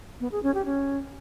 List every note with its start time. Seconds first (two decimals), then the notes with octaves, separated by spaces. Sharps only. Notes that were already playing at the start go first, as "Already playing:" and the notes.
0.20 B3
0.32 G#4
0.43 C#4
0.54 G4
0.65 C#4